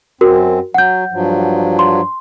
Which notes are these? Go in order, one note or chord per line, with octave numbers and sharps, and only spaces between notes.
F#2 C4 F#4 A#4
F#3 F#5 G6
G2 F3 F#3
C6